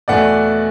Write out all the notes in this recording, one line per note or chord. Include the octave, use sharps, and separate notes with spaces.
E2 B2 A3 D5 F#5